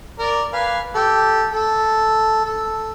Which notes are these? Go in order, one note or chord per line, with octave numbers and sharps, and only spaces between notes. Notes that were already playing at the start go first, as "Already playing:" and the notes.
A#4 D5
B4 F5 G#5
G4 A4
A4
A4